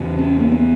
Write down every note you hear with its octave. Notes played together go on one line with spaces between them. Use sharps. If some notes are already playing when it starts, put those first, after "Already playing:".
Already playing: E2 C#3
C#4
A#3
B3